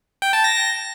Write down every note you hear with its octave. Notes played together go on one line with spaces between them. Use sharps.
G5
A5
A#6